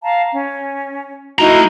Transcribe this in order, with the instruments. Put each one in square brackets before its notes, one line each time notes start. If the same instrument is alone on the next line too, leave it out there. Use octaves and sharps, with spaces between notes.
[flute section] F5 A5 A#5
C#4
[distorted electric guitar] A3 A#5 [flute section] D#4 E4 F#4